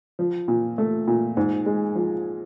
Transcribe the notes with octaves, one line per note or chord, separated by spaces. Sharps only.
F3
A#2
A3
A#2
G#2
G#3
F3